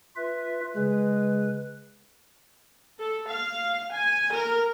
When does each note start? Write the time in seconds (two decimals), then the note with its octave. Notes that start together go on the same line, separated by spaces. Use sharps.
0.16 F4 B4 E5
0.76 C#3 G#3 B4
3.00 A4
3.30 F5
3.93 G#5
4.34 A#4